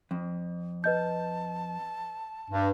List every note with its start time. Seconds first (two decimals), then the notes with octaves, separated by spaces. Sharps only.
0.11 F2
0.84 B4 D#5 A5 G6
2.50 G2